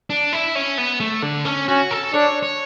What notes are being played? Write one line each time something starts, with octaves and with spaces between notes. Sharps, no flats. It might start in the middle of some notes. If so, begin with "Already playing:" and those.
D4
E4
C#4
B3
A3
D3
C#4
C#4 F#4
A4
D4 C#5
C#5